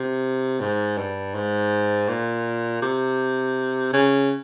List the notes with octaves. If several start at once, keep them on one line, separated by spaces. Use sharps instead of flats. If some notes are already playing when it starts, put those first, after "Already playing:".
Already playing: C3
G#2
G2
G#2
A#2
C3
C#3